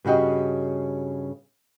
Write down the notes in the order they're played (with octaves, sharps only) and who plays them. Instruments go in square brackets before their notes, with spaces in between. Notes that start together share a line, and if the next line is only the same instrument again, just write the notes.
[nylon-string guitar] G2 C#3 F#4 G4 D#5